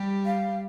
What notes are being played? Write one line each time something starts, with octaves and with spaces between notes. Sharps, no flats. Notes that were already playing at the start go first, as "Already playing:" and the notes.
Already playing: G3 G4
F5